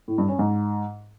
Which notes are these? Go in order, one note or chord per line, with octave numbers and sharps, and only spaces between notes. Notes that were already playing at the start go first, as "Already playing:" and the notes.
A2
G2
C#4
G#2